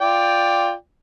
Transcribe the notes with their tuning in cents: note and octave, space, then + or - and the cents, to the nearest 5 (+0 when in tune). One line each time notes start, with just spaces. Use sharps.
F4 +0 D5 +0 G5 +10